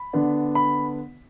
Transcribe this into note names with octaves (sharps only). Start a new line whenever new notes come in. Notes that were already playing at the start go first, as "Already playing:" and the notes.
Already playing: B5
D3 B3 D4
B5